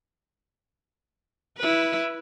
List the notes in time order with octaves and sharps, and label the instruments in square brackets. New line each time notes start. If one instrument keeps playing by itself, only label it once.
[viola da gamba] E4 B4